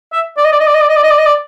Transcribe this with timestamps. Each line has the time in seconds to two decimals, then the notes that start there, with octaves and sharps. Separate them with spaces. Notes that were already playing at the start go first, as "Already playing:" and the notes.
0.13 E5
0.38 D5
0.44 D#5
0.52 D5
0.60 D#5
0.67 D5
0.74 D#5
0.81 D5
0.89 D#5
0.96 D5
1.03 D#5
1.11 D5
1.18 D#5
1.26 D5